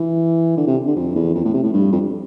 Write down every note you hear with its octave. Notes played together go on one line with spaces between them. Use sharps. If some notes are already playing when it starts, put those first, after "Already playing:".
Already playing: E3
D3
C3
D3
F2
E2
F2
A2
C3
A2
G2
F2